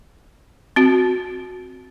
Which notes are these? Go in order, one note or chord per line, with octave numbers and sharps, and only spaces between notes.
C4 F#4